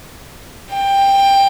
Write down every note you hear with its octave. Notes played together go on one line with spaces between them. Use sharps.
G5